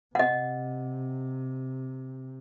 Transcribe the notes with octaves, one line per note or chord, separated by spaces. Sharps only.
C3 D#5 F#5